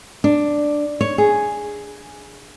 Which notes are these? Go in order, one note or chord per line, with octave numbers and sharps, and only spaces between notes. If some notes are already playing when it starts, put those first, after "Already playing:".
D4
C#5
G#4